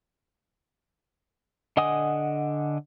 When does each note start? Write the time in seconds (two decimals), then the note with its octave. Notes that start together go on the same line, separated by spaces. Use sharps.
1.77 D3 D#5 F#5 G#5 D#6